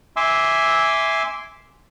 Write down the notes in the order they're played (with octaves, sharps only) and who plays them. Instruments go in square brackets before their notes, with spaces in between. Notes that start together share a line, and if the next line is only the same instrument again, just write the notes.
[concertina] E5 G#5 C6 D6 E6